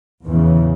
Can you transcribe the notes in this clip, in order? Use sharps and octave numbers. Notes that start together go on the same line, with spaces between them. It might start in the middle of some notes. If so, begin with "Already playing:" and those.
E2 C#3 E3